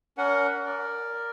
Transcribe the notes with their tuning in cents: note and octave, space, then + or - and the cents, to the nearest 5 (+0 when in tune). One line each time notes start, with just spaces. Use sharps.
C#4 +40 A#4 +0 F#5 +0
A#4 +0 D5 +0